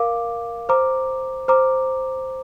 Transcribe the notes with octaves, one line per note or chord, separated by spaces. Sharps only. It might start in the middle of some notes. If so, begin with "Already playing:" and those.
Already playing: A#4 F5 D6
C5 A#5 D6
C5 A#5 D6